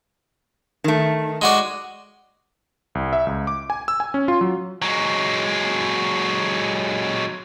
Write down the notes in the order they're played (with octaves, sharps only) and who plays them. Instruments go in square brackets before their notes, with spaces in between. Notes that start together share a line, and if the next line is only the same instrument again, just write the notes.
[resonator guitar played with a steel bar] D#3 A3
[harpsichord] G#3 F#4 D5
[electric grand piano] C2
E5
C#2
D6
G#5
E6
G#5
C#4
F4
F#3
[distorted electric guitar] F#3 G#3